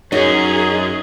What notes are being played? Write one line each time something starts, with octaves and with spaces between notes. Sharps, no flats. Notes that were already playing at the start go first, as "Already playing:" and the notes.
F#2 C#4 D#4 F#4 G#4 A#4 C#5